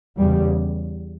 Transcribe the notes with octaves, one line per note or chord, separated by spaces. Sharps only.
E2 C#3 G3